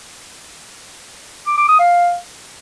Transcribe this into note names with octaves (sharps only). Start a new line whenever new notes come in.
D6
D6
D#6
F5